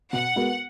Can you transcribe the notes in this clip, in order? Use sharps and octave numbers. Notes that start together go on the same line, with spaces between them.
B2 F#5
G#3 B3 F#4 A#4